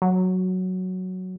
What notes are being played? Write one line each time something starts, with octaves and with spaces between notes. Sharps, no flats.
F#3